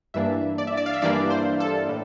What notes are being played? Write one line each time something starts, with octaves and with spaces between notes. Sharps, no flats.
G2 E3 A#3 D4 E5
D5
E5
D5
F5
E5
G2 E3 A#3 D4 D5
C5
A4
A2